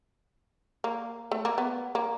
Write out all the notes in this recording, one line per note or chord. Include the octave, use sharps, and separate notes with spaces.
A#3
A3
A#3
B3
A#3